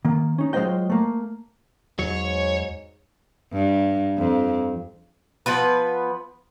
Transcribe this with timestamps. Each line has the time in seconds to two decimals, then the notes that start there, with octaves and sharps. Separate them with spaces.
0.05 D#3 A#3
0.38 C#4 D#4
0.53 F#3 G#3 F4 C5 D#5 G5
0.90 A3 A#3
1.99 E2 G#2 F#3 C#5
3.53 G2
4.18 F2
5.46 F3 B3 B4